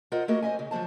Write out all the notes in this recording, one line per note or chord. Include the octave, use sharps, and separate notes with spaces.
F4 A#4 C5 D#5 F#5
A3 A#3 F#4 A#4 D#5
C5 D#5 E5 G#5
C#3
F3 F#3 A3 C5 A5